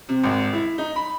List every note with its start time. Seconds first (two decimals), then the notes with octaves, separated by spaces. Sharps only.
0.09 C3
0.23 G#1
0.53 E4
0.78 D#4
0.96 B5